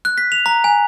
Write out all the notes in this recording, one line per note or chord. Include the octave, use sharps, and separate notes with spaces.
F#6
B6
F7
A#5
G#5